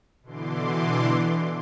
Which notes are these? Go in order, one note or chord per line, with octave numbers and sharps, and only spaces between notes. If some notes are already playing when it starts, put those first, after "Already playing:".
B2 D3 E3 C6 D6